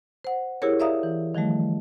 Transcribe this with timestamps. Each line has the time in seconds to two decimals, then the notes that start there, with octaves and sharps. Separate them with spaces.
0.25 C5 F#5
0.62 E4 G4 G#4 A#4 C#5
0.80 D5 E5 F5 A#5 D#6
1.03 E3
1.35 D#3 F3 G3 A3